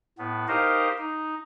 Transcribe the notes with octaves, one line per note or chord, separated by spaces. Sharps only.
A2 B3
D#4 G4 A#4 C5 D#5 F5
D#4